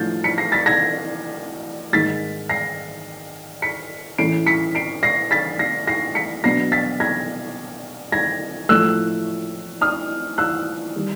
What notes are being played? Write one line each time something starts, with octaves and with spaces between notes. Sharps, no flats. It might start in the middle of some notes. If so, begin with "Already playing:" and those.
Already playing: A2 F3 A3 D4 G6 A6
B6 C#7
A#6 C7
A6 B6
G#6 A#6
G#2 D#3 G#3 A6 B6
A#6 C7
B6 C#7
A2 E3 A3 C#4 C7 D7
B6 C#7
C7 D7
A#6 C7
A6 B6
A#6 C7
A#6 C7
B6 C#7
B2 F#3 B3 D4 A#6 C7
A6 B6
G#6 A#6
G#6 A#6
A2 F3 A3 E6 F#6
D#6 F6
E6 F#6
D#3 G3